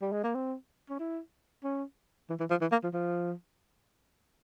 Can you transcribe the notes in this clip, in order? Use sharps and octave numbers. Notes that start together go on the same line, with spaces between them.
G3
G#3
A#3
C4
C#4
E4
C#4
E3
E3
F3
E3
A#3
F3
F3